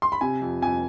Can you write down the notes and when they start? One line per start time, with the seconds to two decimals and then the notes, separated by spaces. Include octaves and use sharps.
0.02 C6
0.12 B5
0.21 C3 G#5
0.42 F2
0.62 F2 G#5